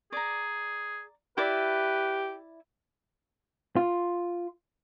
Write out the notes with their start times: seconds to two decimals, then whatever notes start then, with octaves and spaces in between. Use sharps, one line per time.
0.12 G#4 D5 A#5
1.38 E4 G4 B4 D5 E5
3.76 F4